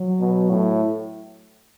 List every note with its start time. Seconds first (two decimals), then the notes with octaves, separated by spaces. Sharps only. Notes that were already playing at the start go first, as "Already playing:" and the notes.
Already playing: F#3
0.20 B2
0.50 A2